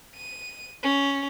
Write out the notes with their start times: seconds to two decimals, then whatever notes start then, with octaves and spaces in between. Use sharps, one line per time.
0.16 D#7
0.83 C#4